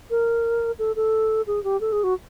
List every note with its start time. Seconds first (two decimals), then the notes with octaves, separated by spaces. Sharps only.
0.10 A#4
0.79 A4
0.96 A4
1.47 G#4
1.64 G4
1.81 A4
1.92 G#4
2.04 F#4